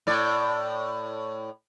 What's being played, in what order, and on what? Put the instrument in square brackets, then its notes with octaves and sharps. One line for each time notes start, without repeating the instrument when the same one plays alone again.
[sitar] A2 D5